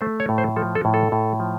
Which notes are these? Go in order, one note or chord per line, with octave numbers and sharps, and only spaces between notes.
A3 C5
C#5
A2
C5
F3 A4
A4
A2
A4
A2
F3